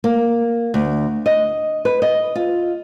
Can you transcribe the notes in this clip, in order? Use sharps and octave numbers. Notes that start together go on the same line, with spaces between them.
A#3
D2
D#5
B4
D#5
F4